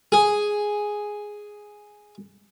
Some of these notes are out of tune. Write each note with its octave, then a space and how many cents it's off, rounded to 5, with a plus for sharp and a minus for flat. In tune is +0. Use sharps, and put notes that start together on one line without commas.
G#4 +0